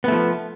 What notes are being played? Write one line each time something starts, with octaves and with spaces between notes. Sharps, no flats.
F3 A3 B3